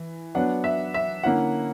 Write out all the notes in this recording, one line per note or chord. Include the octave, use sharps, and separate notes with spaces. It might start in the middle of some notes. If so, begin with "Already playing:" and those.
Already playing: E3
F#3 B3 D4 F#5
E5
E5
D3 A#3 C#4 E4 F#5